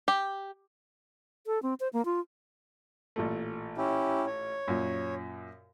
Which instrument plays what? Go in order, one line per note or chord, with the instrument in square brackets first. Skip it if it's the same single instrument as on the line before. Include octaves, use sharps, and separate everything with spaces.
[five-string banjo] G4
[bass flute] A4
C4
C5
A#3
F4
[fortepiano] A1 A#2 A3
[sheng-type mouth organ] C#4 E4 G4
C#5
[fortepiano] F#2 A#2